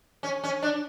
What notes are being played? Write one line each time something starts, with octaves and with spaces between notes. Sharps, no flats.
C#4
C#4
D4